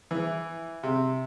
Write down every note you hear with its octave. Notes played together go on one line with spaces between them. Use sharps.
E3
C3